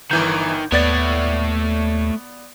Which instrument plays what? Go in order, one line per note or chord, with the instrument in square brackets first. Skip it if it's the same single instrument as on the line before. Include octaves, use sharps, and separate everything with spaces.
[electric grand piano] G1 E3 G6 [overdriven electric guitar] D#3
[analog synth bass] D#2 [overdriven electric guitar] A3 C#5 [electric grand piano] B3 D5 A6